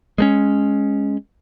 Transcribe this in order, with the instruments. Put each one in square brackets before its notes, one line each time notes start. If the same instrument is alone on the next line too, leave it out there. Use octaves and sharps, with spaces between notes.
[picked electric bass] G#3 A3 C#4